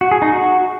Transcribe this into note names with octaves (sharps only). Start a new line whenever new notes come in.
F#4
G#4
D#4
F#4